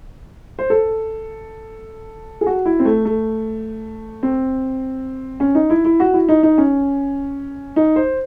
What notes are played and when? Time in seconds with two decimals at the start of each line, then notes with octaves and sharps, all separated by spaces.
0.59 C5
0.70 A4
2.41 G#4
2.46 F#4
2.65 E4
2.80 C4
2.85 A3
3.05 A3
4.23 C4
5.40 C#4
5.55 D#4
5.70 E4
5.85 E4
6.00 F#4
6.14 E4
6.29 D#4
6.43 D#4
6.58 C#4
7.76 D#4
7.96 C5